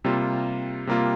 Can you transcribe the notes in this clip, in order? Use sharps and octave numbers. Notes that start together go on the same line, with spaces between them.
C3 G3 A#3 F4
C3 G3 A#3 F4